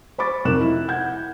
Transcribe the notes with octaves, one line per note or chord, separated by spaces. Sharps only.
C5 B5 C#6 D6 A6
F2 C3 D#4 A#4 F#6 E7
E4
F#5 G6 G#6